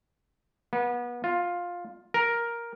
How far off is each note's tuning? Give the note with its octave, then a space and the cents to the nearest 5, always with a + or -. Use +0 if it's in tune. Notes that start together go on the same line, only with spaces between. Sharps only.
B3 -30
F4 +10
A#4 +5